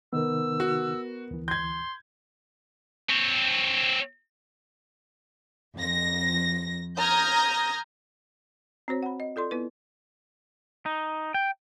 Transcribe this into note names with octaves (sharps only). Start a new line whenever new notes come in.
C3 D#3 B3 D#4 A#4 E6
F#4
D2 E3
C6 G6 G#6
C4 C#5
F2 A#6
A#5 D#6 F6 G6 G#6 A#6
C4 F#4 C5 C#5
F#5 B5
D#5
F4 A4 D5 C6
B3 E4 B4
D#4
G5